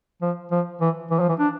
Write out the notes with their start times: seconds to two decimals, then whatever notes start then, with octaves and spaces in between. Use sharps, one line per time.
0.22 F3
0.52 F3
0.81 E3
1.11 E3
1.20 F3
1.29 E3
1.39 D4